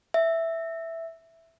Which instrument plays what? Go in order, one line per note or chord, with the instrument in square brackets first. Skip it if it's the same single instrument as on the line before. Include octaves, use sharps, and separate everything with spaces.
[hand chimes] E5